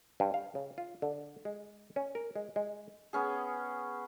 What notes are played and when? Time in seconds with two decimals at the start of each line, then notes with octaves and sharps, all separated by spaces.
0.20 G2
0.34 F5
0.55 C#3
0.78 F4
1.02 D3
1.45 G#3
1.96 C#4
2.15 A#4
2.36 G#3
2.56 G#3
3.13 B3 C#4 G#4